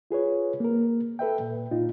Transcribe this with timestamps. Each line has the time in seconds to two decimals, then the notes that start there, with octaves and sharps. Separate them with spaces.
0.11 F4 G#4 B4 C#5
0.60 A#3 A#4
1.19 A4 B4 E5 G5
1.40 A#2
1.71 A#2 D#4 F4